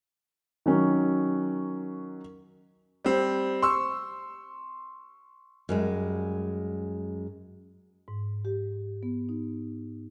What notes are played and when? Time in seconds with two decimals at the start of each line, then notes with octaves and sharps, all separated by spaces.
0.66 D#3 F#3 C#4
3.05 G3 C4
3.62 C6 C#6 E6
5.69 F#2 G3 G#3
8.08 G#2
8.45 G4
9.03 B3
9.29 D#4